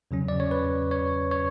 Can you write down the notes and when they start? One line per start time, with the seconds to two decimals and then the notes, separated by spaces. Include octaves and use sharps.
0.11 E2 C#3 F#3 C#4
0.28 D5
0.40 C#5
0.51 B4
0.91 C#5
1.31 C#5